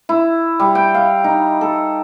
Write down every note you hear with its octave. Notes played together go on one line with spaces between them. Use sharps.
E4
G3
G5
F5
D#4
A4